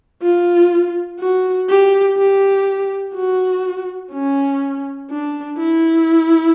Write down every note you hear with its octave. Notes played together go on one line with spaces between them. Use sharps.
F4
F#4
G4
G4
F#4
C#4
D4
E4